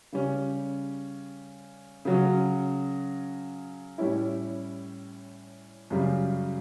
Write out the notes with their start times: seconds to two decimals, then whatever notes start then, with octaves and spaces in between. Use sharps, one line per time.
0.13 C#3 G3 C#4
2.05 C#3 F#3 C#4
3.98 A2 G3 C#4 E4
5.90 F#2 C#3 G3